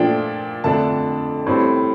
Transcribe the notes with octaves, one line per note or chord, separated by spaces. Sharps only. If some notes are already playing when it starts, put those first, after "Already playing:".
Already playing: A#2 F3 A3 D4 G5
F2 D3 A3 D4 A5
A2 G3 C4